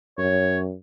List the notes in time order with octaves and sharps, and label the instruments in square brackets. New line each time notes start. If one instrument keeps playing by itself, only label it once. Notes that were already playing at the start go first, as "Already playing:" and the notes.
[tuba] F#2 [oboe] C#5